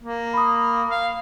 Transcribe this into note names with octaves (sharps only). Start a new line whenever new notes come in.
A#3
B5 D#6
F5